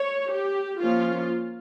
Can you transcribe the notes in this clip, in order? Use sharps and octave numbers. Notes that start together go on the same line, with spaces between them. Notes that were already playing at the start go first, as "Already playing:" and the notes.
Already playing: C#5
G4
F3 A#3 C#4 F4